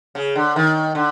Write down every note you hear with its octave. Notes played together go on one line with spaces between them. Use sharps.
C#3
D3
D#3
D3